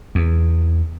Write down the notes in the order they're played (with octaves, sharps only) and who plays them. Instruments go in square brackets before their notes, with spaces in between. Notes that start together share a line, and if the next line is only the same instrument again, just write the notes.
[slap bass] E2